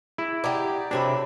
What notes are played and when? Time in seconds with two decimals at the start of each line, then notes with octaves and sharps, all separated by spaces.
0.18 E4 G#4
0.44 G4 D5 D#5 F#5 A#5 G#6
0.91 C3 D4 F#4 G#4 A#4 C#5 E5 B5